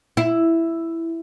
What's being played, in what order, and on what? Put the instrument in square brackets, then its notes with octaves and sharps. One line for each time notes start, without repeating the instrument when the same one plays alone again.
[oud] E4